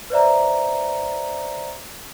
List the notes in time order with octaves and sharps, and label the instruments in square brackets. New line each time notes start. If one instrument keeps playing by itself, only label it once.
[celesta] B4 C5 D5 E5 A#5